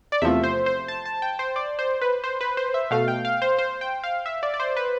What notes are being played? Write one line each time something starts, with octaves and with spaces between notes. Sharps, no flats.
D5
E2 C3 F3 A3 E5
C5
C5
A5
A5
G5
C5
D5
C5
B4
C5
B4
C5
E5
B2 A3 F5
G5
F5
C5
C5
G5
F5
E5
D5
D5
C5
B4